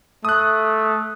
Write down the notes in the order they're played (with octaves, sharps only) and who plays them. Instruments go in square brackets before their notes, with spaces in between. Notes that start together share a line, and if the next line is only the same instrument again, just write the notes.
[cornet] A3 [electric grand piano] D#6 F#6